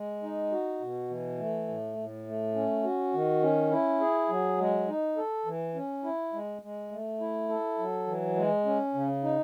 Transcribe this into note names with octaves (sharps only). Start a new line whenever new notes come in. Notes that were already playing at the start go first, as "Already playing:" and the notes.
Already playing: G#3
D#4
F#4
B2
E3
A3
A2
A2
A3
C#4
F#4
D#3
C#4
E4
G#4
F#3
G#3
D#4
A4
E3
C#4
E4
G#3
G#3
A3
E4
A4
F#3
E3
G#3
C#4
C#3
D#4